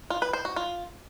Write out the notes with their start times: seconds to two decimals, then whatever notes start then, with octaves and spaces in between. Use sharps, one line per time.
0.10 F4
0.22 B4
0.33 C5
0.45 F#4
0.56 F4